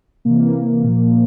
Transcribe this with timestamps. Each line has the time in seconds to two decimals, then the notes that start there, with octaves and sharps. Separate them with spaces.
0.25 C3 E3 A#3
0.83 A#2 F3